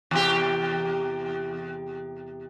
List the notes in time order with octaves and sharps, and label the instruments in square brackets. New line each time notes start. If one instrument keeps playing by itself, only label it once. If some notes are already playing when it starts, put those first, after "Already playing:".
[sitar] E2 C3 G4